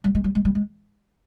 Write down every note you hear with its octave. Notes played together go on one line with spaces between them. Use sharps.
G3
G#3
G3
G#3
G3
G#3